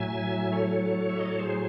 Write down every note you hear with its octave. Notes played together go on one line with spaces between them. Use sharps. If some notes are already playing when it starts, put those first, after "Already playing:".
Already playing: A2 F#3 E5 G#5
A4 C#5
E5
D#5
C#5
G#4 C5